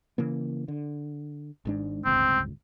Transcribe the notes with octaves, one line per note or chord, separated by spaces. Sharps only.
C#3 E3 A#3
D3
G#1 G#2 D4
D1 G1 C#2 C4